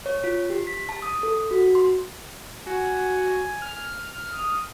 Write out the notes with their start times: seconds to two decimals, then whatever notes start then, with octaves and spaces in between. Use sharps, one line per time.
0.06 C#5
0.24 F4
0.50 G4
0.67 B6
0.89 A5
1.02 D#6
1.23 A4
1.51 F#4
1.75 C6
2.67 F#4 G#5
3.62 F6
4.31 D#6